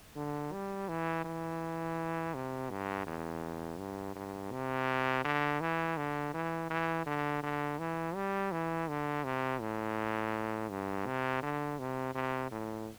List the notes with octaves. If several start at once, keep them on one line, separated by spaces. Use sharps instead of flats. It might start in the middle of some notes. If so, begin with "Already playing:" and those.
D3
G3
E3
E3
C3
G2
E2
G2
G2
C3
D3
E3
D3
E3
E3
D3
D3
E3
G3
E3
D3
C3
A2
G2
C3
D3
C3
C3
A2